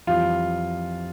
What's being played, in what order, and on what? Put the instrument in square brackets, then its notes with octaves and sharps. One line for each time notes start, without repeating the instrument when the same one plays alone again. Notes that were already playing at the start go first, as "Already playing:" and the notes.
[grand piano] F2 E3 G3 F4